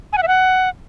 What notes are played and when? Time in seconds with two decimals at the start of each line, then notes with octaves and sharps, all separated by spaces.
0.13 G#5
0.18 F#5
0.23 E5
0.28 F#5